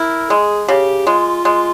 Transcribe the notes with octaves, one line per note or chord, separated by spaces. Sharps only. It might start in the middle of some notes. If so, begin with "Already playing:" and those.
Already playing: E4 A#4
G#3 G#4
C#3 G4
G#3 F4
G#3